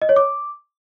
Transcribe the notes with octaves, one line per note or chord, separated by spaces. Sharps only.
D#5
C#5
D6